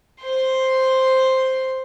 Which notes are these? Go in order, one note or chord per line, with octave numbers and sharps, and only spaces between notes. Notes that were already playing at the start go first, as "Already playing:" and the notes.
C5 C6